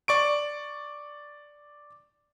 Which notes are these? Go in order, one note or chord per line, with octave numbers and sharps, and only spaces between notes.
D5 C#6 D7